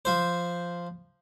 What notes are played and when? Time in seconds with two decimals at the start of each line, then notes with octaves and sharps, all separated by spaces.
0.05 F3 C5